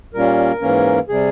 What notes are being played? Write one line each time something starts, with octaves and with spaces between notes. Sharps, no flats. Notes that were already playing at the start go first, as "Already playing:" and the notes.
A#2 G3 A#3 C#4 A#4
G#2 E3 A#3 C#4
C3 G3 G#4